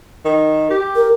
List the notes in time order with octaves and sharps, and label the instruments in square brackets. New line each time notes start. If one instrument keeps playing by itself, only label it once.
[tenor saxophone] D#3
G4
[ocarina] A#4